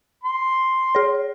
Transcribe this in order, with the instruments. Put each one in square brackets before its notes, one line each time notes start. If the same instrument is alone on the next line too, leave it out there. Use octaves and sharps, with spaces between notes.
[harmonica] C6
[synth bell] G#4 C#5